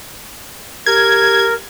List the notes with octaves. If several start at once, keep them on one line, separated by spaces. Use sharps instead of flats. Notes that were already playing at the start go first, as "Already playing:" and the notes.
G4 A#4 G#6